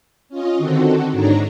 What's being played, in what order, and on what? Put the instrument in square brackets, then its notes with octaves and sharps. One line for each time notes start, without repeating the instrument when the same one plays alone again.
[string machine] C#4 F4 D#5
D3 D#3 C4 F#4 A4
G#2 D4 D#4 C#5 A#5